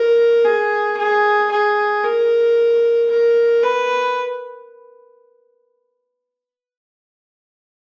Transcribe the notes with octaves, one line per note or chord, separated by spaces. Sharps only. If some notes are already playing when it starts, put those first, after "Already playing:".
Already playing: A#4
G#4
G#4
G#4
A#4
A#4
B4